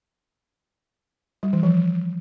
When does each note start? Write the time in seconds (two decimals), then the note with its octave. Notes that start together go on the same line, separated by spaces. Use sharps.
1.43 G3
1.53 E3
1.63 F3